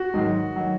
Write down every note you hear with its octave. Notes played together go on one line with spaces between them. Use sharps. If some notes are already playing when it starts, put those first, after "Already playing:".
Already playing: F#4
G#2 D#3 F#3
D#3 F#3